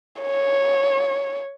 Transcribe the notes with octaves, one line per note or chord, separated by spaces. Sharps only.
C#5